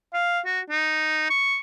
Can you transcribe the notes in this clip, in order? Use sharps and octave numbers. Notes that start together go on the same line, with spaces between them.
F5
F#4
D#4
C#6